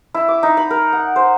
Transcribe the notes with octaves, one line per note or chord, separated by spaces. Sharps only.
E4
D6
D#4
B5
A#4
F#5
C5